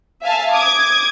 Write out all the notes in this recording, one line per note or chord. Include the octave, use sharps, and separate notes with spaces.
E5 F5 G#5 A5
D6 D#6 G#6